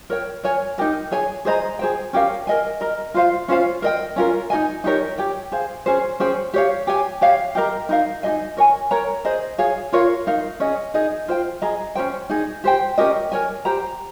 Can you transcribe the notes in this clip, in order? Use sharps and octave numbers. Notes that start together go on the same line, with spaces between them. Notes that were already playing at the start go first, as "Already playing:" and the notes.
A#4 C#5 G5
A#4 C#5 G#5
D#4 G4 A#4
G#4 C#5 G#5
G#4 C5 D#5 A#5
G#4 C5 G5
C#4 G4 A#4 F5
A#4 D#5 G#5
A#4 D#5 A#5
F4 C5 F5
C#4 F4 C5 F5
A#4 D#5 G5
C#4 F4 A#4
D#4 G#4 D#5 G#5
D#4 G4 A#4 C#5
G4 C#5 G5
G#4 C5 F5
C#4 G#4 C5
C#4 G#4 C5 G5
G4 C#5 F5
G4 C#5 G#5
G4 C#5 F5
G4 A#4 D#5 A#5
D#4 A#4 F5
D#4 G#4 D#5 G#5
A#4 C#5 G#5
A#4 C#5 G5 A#5
G#4 C5 D#5
G#4 C#5 F5
F4 A#4 C#5 F5
D#4 A#4 F5
C#4 G#4 D#5
D#4 G#4 D#5
F4 C5 G5
G#4 D#5 A#5
C#4 G#4 C5 G5
D#4 G#4 D#5
G4 C5 G5
C#4 G4 A#4 D#5
A#4 C#5 G#5
G4 C5 G5 A#5